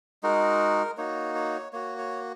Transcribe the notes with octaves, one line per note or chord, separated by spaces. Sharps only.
G#3 D#4 F#4 A#4
A#3 D#4 F#4 C#5
C#5
A#3 F#4 C#5
C#5